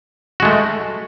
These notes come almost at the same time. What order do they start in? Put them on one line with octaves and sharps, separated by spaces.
F#4 G#3 A3